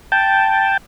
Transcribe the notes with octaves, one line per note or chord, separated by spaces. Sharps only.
G5 A5